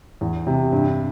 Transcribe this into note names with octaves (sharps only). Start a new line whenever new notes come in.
E2
C3
G2